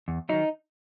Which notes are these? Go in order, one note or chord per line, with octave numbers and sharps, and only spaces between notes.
E2
D#3 F#3 D#4